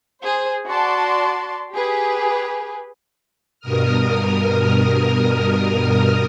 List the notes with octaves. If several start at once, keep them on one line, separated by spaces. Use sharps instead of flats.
G#4 C5
F#4 D5 A5 C6
G4 G#4 B4
G2 B2 A#4 D#6 F6